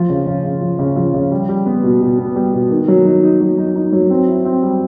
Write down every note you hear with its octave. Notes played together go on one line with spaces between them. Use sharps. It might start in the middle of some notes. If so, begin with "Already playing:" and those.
Already playing: F3
C#3
C#3
C#3
F3
C#3
F3
C#3
G3
G3
B3
B2
B2
B3
G3
B2
D#3
F#3
D#4
D#4
F#3
D#4
D#4
F#3
C4
E4
C4
G3